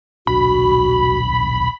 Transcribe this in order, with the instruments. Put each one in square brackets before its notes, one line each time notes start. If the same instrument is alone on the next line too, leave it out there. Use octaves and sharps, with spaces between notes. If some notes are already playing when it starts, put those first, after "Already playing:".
[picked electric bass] D#1 B1 D4 [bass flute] F#4 [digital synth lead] B5